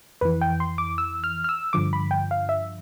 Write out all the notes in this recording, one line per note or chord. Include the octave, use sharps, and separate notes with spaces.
F2 E3 B4
G5
C6
D6
E6
F6
F6
E6
G2 D3 F3 D6
B5
G5
F5
E5